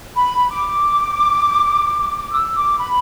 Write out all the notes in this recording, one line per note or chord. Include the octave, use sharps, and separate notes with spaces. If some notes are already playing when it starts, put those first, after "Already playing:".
B5
D6
E6
D6
B5